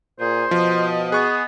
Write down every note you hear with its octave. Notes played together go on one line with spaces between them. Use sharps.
A#2 G#4 C5
B2 F3 D#5
B3 G#4 C#6